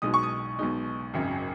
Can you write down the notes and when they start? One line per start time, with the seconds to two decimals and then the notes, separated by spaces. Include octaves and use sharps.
0.02 B1 B2 G#3 D#4 D#6
0.14 C#6
0.23 D#6
0.59 B1 B2 G#3 D#4
1.14 G#1 F#2 C#3